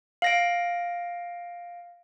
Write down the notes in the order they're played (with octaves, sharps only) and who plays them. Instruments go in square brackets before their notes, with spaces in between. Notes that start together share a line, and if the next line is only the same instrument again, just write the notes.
[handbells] F5 A#6 D7